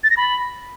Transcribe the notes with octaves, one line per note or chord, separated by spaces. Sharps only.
A6
A#6
B5